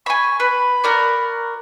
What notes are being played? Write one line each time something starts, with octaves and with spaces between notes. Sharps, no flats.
G#5 B5 C#6
B4 B5
F#4 A#4 D5